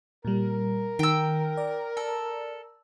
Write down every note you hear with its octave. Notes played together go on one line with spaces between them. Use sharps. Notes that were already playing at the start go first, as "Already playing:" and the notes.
A#2 G3 A#4
D#3 G5 E6
D5
A4